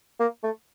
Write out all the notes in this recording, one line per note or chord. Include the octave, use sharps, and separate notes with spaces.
A#3
A3